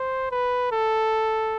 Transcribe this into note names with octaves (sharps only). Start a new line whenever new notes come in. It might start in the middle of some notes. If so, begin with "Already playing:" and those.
Already playing: C5
B4
A4